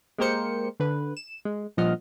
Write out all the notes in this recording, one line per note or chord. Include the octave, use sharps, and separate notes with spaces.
G#3 A#3 G4 A#4 C5 C#7
D3 B4
E7
G#3
G2 A#2 F3 D#5 F#5 F6